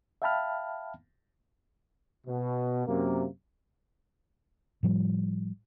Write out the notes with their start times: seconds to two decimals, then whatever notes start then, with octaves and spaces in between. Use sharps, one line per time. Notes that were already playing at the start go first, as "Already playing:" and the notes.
0.22 E5 F5 G5 A5 B5 F6
2.27 B2
2.87 F#2 C3 A#3
4.83 A2 F3 G3